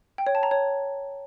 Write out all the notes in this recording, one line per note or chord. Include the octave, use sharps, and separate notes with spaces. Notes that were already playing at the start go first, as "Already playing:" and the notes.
G5
C#5
A5
A#5
C#5